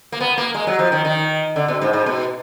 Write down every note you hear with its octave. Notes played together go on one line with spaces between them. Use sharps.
A#3
B3
A#3
G#3
F#3
F3
D#3
D#3
D3
B2
G#2
G#2
B2